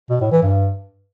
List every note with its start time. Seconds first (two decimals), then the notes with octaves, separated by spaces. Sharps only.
0.10 B2
0.21 A2
0.32 E3
0.43 G2